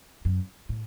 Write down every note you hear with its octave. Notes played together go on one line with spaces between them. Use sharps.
F#2
A2